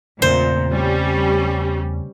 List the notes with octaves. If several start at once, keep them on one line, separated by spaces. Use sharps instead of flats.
E2 A#2 C#3 A3 C4 C5
G3 C#4